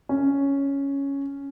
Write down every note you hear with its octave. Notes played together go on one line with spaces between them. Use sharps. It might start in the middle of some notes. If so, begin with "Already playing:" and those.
C#4